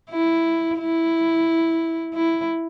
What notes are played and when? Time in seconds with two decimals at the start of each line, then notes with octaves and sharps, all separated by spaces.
0.10 E4
0.78 E4
2.14 E4